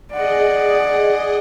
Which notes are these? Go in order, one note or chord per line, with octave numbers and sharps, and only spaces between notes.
G#4 D5 D#5 F#5